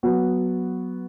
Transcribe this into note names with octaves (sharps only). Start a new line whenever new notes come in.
F#3 B3 F#4